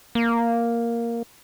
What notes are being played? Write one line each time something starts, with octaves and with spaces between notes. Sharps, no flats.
A#3